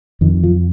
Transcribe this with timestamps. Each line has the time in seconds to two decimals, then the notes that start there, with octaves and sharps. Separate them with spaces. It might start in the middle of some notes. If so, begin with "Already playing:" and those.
0.21 F2 D#3
0.43 F3